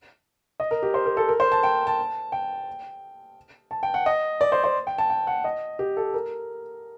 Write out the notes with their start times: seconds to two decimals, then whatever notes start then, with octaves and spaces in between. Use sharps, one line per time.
0.60 D#5
0.71 A#4
0.83 G4
0.94 C5
1.06 A#4
1.17 A4
1.29 A#4
1.40 C5
1.52 A5
1.63 G5
1.87 A5
2.32 G5
3.71 A5
3.83 G5
3.94 F#5
4.06 D#5
4.41 D5
4.52 C5
4.64 C5
4.87 G5
4.98 A5
5.10 G5
5.27 F#5
5.44 D#5
5.79 G4
5.97 A4
6.14 A#4